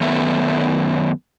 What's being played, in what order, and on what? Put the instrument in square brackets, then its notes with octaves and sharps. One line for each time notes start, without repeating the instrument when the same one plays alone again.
[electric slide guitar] F#2 D#3 A3 B3 E5